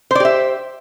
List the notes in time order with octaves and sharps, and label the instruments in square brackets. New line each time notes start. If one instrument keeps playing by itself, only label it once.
[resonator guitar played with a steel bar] C5
D5
G4
E5